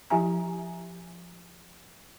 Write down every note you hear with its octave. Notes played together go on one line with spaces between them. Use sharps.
F3 E4 G4 E5 G#5 A#5